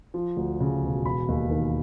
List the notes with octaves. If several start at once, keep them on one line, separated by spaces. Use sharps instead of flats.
F3
D2
C#3
E1
E1 B5
D#2
D#3